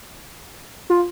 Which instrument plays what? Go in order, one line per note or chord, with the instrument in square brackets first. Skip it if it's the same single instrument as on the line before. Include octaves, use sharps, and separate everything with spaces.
[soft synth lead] F4